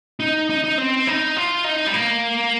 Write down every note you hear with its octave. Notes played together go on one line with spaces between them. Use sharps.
D#4
D#4
D#4
C4
D#4
F4
D#4
G3
A#3